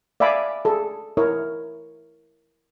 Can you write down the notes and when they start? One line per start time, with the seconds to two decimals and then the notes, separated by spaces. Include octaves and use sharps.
0.20 D5 E5 F5 G#5 B5 D6
0.65 G#4 A4
1.17 E4 A#4 C#5